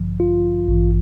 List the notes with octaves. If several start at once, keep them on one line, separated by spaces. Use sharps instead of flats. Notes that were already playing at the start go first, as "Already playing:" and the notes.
Already playing: A1 G2 D3 F3
F4
A1 G2 E3